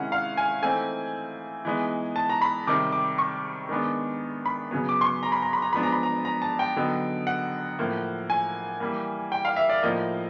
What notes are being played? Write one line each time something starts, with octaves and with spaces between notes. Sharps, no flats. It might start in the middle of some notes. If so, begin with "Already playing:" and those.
Already playing: C3 D#3 G#3 C#4 E4 F#5
F5
G#5
E3 A3 C4 D#4 G#5
E3 G#3 B3 D#4
A5
A#5
B5
C3 D#3 G3 D6
D6
C#6
D#3 G#3 B3 D4
B5
C#3 F#3 B3
D6
C6
C#6
A#5
B5
A#5
B5
A#5
F3 G#3 B3 D4 B5
A#5
B5
A#5
A#5
A5
G5
D3 F#3 B3 D#4
F#5
A2 F3 A#3
G#5
E3 G3 A#3
G5
F5
E5
D5
A2 F3 A#3 D#4 D#5